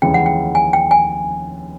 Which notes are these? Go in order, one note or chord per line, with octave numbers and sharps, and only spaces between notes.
F1 D#2 C#3 E3 G#3 G5
F#5
G5
G#5
G5
G#5